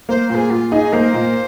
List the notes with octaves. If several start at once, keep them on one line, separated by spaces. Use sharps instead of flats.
A#3 C5
A#2 C5
G#4
A#2 F4
D#4 G#4
A#3 C5
A#2